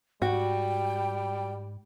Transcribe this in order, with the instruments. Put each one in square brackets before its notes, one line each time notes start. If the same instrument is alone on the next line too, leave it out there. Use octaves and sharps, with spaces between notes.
[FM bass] G#2 [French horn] G3 [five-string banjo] F#4 [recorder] G5